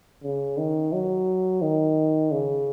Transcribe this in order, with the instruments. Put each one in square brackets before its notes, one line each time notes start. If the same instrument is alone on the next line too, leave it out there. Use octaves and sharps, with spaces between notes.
[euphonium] C#3
D#3
F#3
D#3
C#3